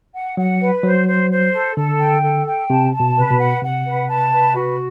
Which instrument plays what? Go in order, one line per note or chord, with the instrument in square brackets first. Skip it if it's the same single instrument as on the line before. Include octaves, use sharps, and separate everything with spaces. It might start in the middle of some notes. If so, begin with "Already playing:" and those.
[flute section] F#5
[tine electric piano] F#3 [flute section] F#5
[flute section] B4
[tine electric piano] F#3 [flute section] C5
[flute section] C5
C5
A4
[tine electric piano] D3 [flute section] A4
[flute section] G5
A4
G5
[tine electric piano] C3 [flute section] A5
[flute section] A5
[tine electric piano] B2
[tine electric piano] C3 [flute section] B4
[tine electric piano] B2
[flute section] F#5
[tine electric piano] C3 [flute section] F#5
[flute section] B4
A5
B4
F#4